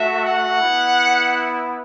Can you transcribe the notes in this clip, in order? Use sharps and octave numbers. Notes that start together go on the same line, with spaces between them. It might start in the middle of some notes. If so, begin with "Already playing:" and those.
Already playing: A3 F#4 E5
F#5
B3 E4